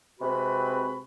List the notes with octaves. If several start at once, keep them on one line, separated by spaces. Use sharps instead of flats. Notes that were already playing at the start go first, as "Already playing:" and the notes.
C3 G#3 C4 F#4 B4 B5